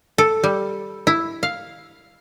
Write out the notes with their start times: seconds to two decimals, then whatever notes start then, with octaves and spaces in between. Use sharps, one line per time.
0.18 A4
0.44 G3
1.07 E4
1.43 F5